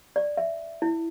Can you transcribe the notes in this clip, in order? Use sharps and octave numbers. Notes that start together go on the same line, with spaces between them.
D5
E5
E4